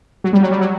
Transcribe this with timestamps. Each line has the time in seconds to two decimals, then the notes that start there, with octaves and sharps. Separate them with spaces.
0.24 F#3
0.33 G3
0.43 F#3
0.51 G3
0.61 F#3